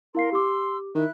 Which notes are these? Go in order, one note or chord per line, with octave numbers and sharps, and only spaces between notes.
E4 A#4 F5 C6 C7
G4 C6 D6 E6
D#3 E4 E5 F#6